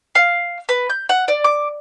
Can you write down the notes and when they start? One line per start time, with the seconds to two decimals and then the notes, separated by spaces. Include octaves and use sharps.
0.15 F5
0.69 B4
0.90 G6
1.09 F#5
1.28 D5
1.44 D6